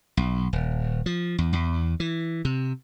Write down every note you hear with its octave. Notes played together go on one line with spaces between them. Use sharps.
B1
D#1
F3
E2
E2
E3
C3